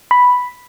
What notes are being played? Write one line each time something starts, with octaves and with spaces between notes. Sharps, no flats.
B5